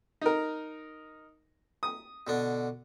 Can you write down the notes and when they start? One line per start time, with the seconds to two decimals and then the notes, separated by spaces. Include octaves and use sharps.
0.21 D#4 A#4
1.83 D#6
2.27 B2 D3 D4